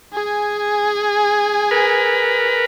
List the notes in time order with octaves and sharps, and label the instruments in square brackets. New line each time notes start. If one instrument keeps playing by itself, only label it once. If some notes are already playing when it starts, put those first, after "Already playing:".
[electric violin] G#4 G#5
[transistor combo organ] A#4 B4